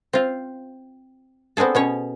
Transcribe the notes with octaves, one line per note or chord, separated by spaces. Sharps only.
C4 F4
B3 C4 D4 G#4 A4
B2 C#4 C#5